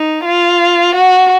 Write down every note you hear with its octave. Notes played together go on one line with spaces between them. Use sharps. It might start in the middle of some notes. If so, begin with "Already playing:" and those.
Already playing: D#4
F4
F#4